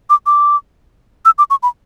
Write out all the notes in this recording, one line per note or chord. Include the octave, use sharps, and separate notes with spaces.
D6
D6
E6
D6
C#6
B5